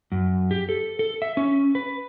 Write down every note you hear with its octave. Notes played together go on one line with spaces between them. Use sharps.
F#2
G4
A4
A4
E5
C#4
B4